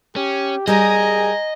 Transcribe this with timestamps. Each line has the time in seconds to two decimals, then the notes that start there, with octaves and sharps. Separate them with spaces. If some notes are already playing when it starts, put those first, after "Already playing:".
0.16 C#4 G4
0.67 G3 G4 G#4 A#4 D#5 G#5 A#5